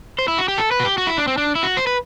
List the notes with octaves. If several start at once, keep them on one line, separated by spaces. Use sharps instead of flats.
C5
E4
F#4
G4
A4
B4
F#4
G4
F#4
E4
D4
C4
D4
E4
F#4
C5
B4